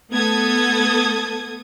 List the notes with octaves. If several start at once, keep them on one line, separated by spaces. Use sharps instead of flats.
A3 B3 A4 D#6 G#6